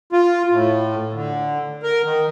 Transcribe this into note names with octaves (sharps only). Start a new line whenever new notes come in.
F4
A2
D3
A#4
D#3